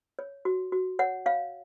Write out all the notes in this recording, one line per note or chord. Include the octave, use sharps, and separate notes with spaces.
C#5
F#4
F#4
C#5 F#5
C#5 F5